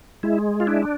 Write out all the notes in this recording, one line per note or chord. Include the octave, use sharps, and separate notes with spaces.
G#3 E4
F4
D4 E4